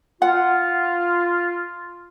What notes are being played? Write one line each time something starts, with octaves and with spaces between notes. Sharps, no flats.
F4 F#5